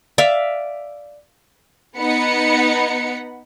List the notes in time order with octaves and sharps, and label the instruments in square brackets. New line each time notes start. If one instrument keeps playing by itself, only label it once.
[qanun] D5 E5 F5
[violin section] B3 D#4 F#5 B5 C#7